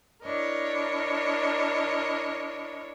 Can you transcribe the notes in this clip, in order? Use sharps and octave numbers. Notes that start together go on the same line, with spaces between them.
D4 E4 A#4 C#5 D#5